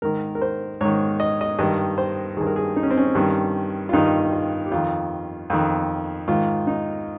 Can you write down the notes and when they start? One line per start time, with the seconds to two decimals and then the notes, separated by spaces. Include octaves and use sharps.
0.02 G#2 D#3 A#4
0.35 A#4
0.42 C5
0.81 G#2 D#3 C#5
1.20 D#5
1.41 D#5
1.59 G2 D#3 D#5
1.98 C5
2.37 G2 D#3 G#4
2.46 A#4
2.56 G#4
2.76 D#4
2.83 C#4
2.90 C4
2.97 C#4
3.15 G2 D#3
3.89 F4
3.93 G2 D#3 D#4
4.32 F4
4.66 G4
4.72 F2 D#3 F4
5.50 F2 D#3
6.28 G#2 D#3 F4
6.67 D#4